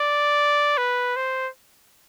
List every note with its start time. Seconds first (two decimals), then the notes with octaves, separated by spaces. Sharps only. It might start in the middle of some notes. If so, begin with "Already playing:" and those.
Already playing: D5
0.78 B4
1.16 C5